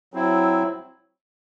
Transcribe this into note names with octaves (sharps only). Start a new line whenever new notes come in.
F#3 C4 E4